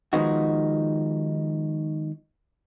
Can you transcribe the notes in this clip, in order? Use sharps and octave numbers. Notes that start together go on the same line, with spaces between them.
D#3 F3 G#3 B3 D#4 F#4